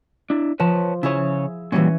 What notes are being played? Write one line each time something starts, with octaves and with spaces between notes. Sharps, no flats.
D4 E4
F3 B4 C#5 A5
C#3 E4 G#4 C#5
A#2 E3 F#3 G3 C#4